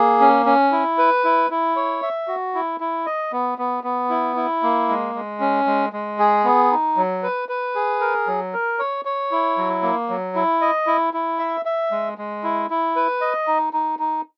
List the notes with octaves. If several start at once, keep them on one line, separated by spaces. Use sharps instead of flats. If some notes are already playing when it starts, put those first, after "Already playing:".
Already playing: A#3 G#4
C#4
C#4
E4
B4
E4
E4
C#5
E5
F#4
E4
E4
D#5
B3
B3
B3
E4
E4
A#3
G#3
G#3
C#4
G#3
G#3
G#4
B3
D#4
F#3
B4
B4
G#4
A#4
F#3
A#4
C#5
C#5
E4
F#3
A#3
F#3
E4
D#5
E4
E4
E5
E5
G#3
G#3
E4
E4
B4
D#5
D#4
D#4
D#4